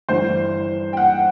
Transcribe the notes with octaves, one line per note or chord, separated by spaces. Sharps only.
G1 G2 E3 C5
G5
F#5